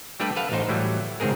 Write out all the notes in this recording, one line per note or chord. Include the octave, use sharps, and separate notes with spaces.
G3 A3 D4 G4 B4
A4 B4 F5 F#5
A1 D#4 C5 G5
A2 E3 F#3 G3
C#2 G#2 D#3 C4 G#4 A#4